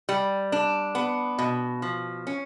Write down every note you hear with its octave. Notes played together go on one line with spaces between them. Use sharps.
G3
D4
B3
B2
F3
C#4